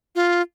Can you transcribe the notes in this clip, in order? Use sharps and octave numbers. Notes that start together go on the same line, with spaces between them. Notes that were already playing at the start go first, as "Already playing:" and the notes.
F4